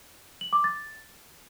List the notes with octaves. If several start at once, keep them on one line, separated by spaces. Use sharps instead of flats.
F#7
D6
A6